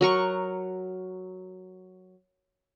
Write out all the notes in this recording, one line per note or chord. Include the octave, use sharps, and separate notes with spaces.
F#3 A#4 C#6